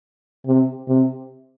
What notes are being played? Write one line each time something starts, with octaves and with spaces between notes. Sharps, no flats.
C3
C3